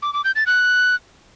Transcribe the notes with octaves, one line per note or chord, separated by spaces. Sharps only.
D6
D6
G6
A6
F#6